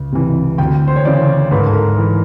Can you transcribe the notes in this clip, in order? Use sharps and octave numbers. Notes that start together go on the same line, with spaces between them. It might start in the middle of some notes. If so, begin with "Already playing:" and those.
Already playing: C#2
C3 E3
D2 G5
C5
C#5
C#3 E3 D5
G#2 B4
A#4
A4
A#4
E3